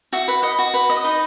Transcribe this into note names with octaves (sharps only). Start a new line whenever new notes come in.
F#4 E5
B4 F#5
D#5 F#5
F#4
B4
D#5
D#4